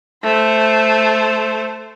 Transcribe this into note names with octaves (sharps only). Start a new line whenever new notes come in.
A3 C5